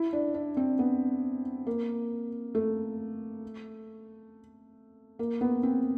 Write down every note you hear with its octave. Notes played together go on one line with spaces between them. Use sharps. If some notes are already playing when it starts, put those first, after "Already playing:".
Already playing: E4
D4
D4
C4
B3
A#3
A3
A#3
B3
C4